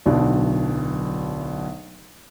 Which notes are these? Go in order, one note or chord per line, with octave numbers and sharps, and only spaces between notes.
D1 B1 B2 D4 D5